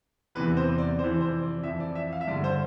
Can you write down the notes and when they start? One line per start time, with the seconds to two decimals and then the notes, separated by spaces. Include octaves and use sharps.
0.35 E2 C3 E3 B4
0.57 C5
0.78 D5
0.99 F2 C3 E3 C5
1.21 C5
1.42 D5
1.63 F2 E3 E5
1.80 D5
1.95 E5
2.12 F5
2.21 E5
2.28 G2 D3 D5
2.44 C5